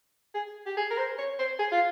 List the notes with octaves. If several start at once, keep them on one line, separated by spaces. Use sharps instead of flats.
G#4
G4
G#4
A#4
C5
C#5
C5
G#4
F4